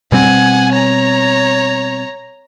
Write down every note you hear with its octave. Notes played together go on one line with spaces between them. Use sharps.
B2 G3 C4 F#5 G#5
C#5 A#5